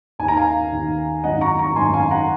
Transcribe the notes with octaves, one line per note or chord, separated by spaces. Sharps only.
D#2 D#3 G#5
A#5
F5 G#5
D#2 D#3
G#1 F#2 D#3 D#5 F#5
A#5 C#6
A#5 C#6
G#1 F#2 D#3 G#5 C6
F5 G#5
F#5 A#5